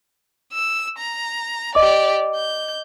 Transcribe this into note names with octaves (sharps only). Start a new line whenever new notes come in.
E6
A#5
G4 D5 D#5 D6
G6